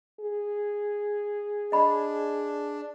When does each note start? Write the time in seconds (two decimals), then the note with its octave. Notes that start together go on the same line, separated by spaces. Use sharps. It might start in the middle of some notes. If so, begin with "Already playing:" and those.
0.20 G#4
1.72 D4 D#5 B5